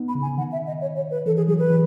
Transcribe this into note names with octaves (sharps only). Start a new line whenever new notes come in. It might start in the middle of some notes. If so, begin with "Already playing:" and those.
Already playing: B3 D#4
B5
C#3
G#5
D#3 F#5
E5
D#5
C#5
C#5
B4
E3 A4
G#4
F#3 G#4
B4
E3